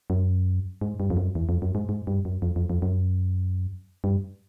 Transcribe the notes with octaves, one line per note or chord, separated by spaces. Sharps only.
F#2
G#2
G2
F2
F#2
E2
F2
F#2
G#2
G#2
G2
F#2
F2
F2
F2
F#2
G2